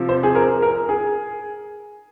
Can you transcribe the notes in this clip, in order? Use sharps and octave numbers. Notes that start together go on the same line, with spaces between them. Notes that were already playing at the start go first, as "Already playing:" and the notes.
Already playing: C3 F3
C5
G#4
A#4
A#4
G#4